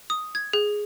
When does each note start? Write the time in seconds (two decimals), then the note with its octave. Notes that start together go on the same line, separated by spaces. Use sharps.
0.10 D#6
0.35 G#6
0.53 G#4